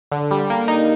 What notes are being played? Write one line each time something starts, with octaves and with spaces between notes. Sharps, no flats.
D3
G3
A#3
D#4